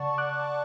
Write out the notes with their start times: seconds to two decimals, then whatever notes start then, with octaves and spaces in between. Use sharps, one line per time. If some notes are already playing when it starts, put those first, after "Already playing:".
Already playing: C#3 D5 F#5 A5 C#6
0.18 D6 F#6